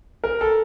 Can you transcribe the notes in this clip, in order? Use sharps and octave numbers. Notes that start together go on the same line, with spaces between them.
A#4
A4